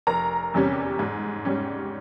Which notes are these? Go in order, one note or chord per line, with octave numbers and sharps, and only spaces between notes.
F1 A#4 A#5
E2 C3 G3 C#4
G#2
G3 C#4